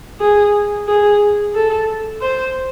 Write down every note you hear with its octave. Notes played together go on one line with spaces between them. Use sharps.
G#4
G#4
A4
C5